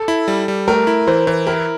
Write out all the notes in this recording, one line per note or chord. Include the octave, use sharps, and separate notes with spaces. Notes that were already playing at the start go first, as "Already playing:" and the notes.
Already playing: A4
E4
G3
G3
A3 A#4
E4
E3 C5
E3 C5
E4 A#4